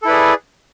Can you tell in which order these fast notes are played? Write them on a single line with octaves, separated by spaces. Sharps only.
A4 E4 B4 D5 G#4